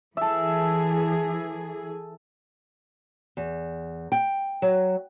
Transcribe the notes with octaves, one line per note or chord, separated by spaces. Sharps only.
E3 G#4 A4 E5
E2
G5
F#3